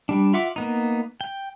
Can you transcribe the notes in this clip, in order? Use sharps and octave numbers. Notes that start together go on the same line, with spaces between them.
G3 D4
F4 E5 F#5 D6
A#3 B3 D#4
G5